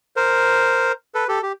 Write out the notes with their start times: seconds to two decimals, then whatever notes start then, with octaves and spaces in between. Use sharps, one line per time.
0.16 A#4 C5
1.15 A4 B4
1.28 G4 A4
1.43 G4